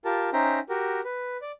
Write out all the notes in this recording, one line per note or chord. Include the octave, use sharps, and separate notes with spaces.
F4 G4 A#4 A5
C#4 D#4 C5 E5 G5 A#5
F#4 G4 A#4
B4
D5